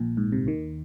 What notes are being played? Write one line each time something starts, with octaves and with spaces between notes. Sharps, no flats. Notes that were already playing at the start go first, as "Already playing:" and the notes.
Already playing: A#1 A#2
G#2
C2 C3
D#2 D#3